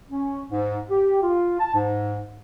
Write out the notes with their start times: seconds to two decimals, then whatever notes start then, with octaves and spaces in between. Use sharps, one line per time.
0.11 C#4
0.50 G#2
0.89 G4
1.22 F4
1.59 A5
1.74 G#2